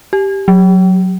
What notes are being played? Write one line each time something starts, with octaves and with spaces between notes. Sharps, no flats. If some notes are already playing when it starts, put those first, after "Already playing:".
G4
F#3